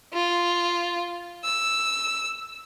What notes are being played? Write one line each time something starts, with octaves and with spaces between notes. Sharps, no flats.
F4
E6